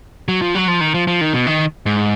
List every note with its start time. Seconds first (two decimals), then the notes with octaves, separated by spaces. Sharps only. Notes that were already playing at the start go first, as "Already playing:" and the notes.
0.28 F#3
0.42 F3
0.55 F#3
0.68 F3
0.81 D#3
0.94 F3
1.07 F3
1.21 D#3
1.33 B2
1.47 D#3
1.86 G#2